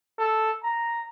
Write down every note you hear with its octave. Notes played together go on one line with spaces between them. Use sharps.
A4
A#5